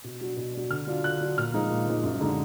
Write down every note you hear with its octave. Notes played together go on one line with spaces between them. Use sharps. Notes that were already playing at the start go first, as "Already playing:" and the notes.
B2
F#3 D4
B2
F#3 D4
D3 F6
F#3 D4 F4
D3 F#6
F#3 D4 F4
A#2 F6
F3 G#3 D#4
A#2
F3 G#3 D#4
F#2
D3 G#3 D#4